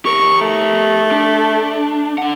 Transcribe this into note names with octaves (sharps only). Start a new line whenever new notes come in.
G4 A#4 C#6
A3
D4
D4 F#5